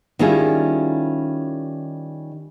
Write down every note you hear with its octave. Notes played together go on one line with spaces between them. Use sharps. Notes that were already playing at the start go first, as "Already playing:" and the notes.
D#3 G3 C#4 E4 F4 G#4